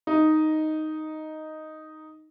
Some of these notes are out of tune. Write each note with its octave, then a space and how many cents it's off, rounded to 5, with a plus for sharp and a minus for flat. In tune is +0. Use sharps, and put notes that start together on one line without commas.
D#4 +0 D#5 +0